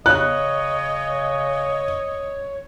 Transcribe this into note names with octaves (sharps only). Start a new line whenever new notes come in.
C#3 C#5 D#5 F#6